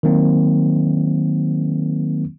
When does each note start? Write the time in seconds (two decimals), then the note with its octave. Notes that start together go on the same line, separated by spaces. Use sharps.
0.03 D#3 F#3 A#3 C4